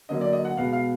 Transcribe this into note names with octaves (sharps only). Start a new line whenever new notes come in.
D3 F#3 A#3 D#5
D5
D#5
F#5
B2 G#3 B3 F5
F5